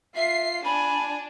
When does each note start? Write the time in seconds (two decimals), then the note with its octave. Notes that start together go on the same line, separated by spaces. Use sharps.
0.16 F4 E5 C7
0.65 D4 G#5 B5